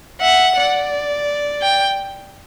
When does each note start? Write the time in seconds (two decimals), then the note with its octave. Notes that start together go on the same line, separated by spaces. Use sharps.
0.21 E5 F#5
0.56 D5
1.62 G5